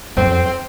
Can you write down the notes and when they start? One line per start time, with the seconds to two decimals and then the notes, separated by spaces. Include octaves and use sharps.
0.17 F2 C4
0.32 C4
0.46 C4